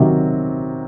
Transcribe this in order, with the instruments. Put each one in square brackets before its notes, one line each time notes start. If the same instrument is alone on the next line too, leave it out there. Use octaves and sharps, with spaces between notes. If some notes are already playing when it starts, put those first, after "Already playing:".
Already playing: [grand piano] C3 D#3 F#3